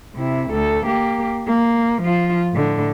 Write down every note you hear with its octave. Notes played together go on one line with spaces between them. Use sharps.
C3 E4
D2 A4
A#3 G4
A#3
F3 F4
A2 D3